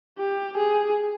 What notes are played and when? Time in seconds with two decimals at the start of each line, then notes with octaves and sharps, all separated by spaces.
0.19 G4
0.57 G#4